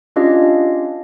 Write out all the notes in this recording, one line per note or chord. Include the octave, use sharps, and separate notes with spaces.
C#4 D4 F4 G4 D#5 F5